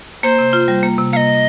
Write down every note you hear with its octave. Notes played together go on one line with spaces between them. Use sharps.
A#3 C5
C3
F4
G3
A#3
C3
A#3 D#5 F5